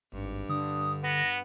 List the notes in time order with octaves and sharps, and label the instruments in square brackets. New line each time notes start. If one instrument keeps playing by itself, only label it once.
[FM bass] G#1 [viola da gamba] G2
[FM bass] D3 [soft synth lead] D#6
[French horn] B3 [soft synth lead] A#6